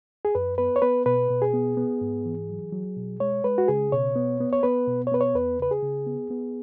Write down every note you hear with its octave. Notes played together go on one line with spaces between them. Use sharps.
G#4
F#2 B4
B3 B4
C#5
B3 B4
B2 B4
B2
G#4
B3
B3
G#2
E3
F#3
F#3
B2
G#3 C#5
G#3 B4
F#4
C#3 G#4
B2 C#5
B3
B3
C#5
B3 B4
B2
C#5
B3 B4
C#5
E2 B4
C#3 B4
G#4
C#3
B3
B3